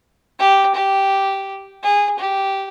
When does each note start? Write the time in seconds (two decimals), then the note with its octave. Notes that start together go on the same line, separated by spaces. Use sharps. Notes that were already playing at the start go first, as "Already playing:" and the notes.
0.39 G4
0.75 G4
1.83 G#4
2.19 G4